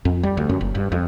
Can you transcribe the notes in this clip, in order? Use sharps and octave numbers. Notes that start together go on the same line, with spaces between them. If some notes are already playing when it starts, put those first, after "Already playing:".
F2
G3
D2
F#2
F#1
G2
F2